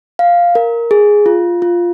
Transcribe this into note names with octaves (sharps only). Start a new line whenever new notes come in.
F5
A#4
G#4
F4
F4